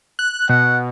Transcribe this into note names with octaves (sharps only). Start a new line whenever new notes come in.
F#6
B2 F#5